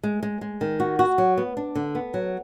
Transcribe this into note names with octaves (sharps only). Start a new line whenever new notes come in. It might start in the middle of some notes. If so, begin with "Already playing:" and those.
G#3
G#3
G#3
D#3
F#4
F#4
F#3
B3
D4
D3
B3
F#3